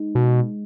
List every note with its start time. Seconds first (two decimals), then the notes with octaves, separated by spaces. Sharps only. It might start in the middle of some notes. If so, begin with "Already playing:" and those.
Already playing: G#3 D#4
0.15 B2